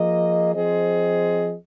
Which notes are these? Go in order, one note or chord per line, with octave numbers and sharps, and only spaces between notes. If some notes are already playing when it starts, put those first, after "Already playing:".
Already playing: F3 A#3 G#4 D#5
F3 C4 G#4 C5 D#5